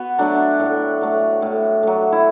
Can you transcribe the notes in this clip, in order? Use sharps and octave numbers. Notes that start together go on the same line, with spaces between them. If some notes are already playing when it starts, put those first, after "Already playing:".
Already playing: B3 F#4
F#3 A3 D4
A2
F#3 A3
A2
F#3 A3
E4